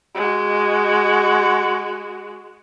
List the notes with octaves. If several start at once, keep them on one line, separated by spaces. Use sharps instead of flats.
G#3 F#4